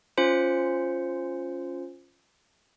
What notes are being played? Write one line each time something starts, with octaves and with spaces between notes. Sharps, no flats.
C#4 F4 C5 C#7